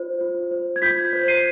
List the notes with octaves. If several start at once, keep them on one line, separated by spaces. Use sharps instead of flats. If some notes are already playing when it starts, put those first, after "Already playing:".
Already playing: F4 C5
F4
C5
G#6
F4 G6 B6
C5
C7 D#7